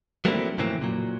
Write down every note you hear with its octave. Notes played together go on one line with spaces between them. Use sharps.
F#3 A3 A#3 C4 D4 E4
F2 A2 C#3 E3 A#3 C4
A#2 F#3